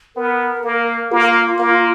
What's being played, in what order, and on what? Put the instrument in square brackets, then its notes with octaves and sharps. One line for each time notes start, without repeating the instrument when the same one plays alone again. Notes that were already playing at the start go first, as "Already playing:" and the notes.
[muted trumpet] B3 [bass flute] A#4
[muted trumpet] A#3 [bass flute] A#4
[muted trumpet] A#3 [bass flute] F4
[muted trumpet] A#3